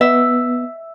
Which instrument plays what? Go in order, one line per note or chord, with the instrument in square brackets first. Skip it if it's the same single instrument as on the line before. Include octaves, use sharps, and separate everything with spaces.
[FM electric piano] B3 [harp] E5